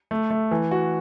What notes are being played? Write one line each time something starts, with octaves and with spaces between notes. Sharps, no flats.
A3
A3
E3
F#4